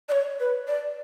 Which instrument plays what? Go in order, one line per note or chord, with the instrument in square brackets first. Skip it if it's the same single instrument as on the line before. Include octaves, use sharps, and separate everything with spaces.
[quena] D5
C#5
B4
D5